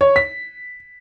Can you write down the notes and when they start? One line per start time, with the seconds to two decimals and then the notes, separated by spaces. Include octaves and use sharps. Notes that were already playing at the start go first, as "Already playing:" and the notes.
0.01 C#5
0.16 B6